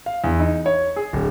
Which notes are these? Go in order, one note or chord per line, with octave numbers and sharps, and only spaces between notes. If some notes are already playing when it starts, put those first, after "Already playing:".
F5
E2
D#4
C#5
G#4
D1